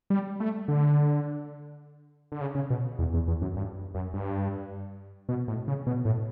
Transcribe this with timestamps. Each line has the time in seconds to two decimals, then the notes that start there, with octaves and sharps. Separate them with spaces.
0.10 G3
0.40 A3
0.68 D3
2.32 D3
2.41 C#3
2.55 C#3
2.70 B2
2.99 E2
3.14 E2
3.28 E2
3.42 F#2
3.56 G2
3.95 F#2
4.13 G2
5.29 B2
5.48 A2
5.68 C#3
5.87 B2
6.05 A2